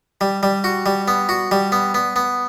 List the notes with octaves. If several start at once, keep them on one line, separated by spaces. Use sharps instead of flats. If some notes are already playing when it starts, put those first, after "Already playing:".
G3
G3
F#4
G3
B3
F#4
G3
B3
B3
B3